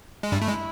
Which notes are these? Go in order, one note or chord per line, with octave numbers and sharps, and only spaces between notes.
G#3
G2 G3 E4
A3
G#3